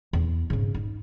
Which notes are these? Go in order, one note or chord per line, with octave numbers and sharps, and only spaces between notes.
E2
G#2 C#3
D#4